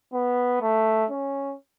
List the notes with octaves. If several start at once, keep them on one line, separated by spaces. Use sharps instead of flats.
B3
A3
C#4